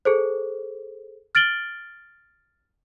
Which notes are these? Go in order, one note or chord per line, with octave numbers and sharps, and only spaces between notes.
G#4 A4 C5
F6 A6 D7 F#7 G7